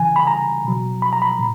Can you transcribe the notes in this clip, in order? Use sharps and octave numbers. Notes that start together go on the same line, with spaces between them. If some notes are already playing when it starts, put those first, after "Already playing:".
Already playing: C#3 E3 G#5
B5
A#5
B2 F#3
B5
A#5
B5
A#2